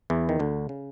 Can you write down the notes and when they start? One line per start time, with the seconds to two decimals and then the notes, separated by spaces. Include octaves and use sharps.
0.10 E2 E3
0.29 D#3
0.39 D2 D3
0.69 C#3